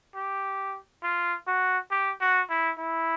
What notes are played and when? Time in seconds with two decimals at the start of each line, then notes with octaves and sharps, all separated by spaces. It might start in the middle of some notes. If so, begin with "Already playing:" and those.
0.16 G4
1.03 F4
1.47 F#4
1.91 G4
2.21 F#4
2.50 E4
2.79 E4